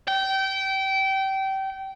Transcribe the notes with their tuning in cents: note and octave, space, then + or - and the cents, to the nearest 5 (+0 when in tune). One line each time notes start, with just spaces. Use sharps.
G5 -25